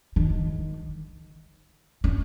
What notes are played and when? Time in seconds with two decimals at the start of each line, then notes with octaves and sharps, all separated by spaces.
0.16 D#3
2.04 C#4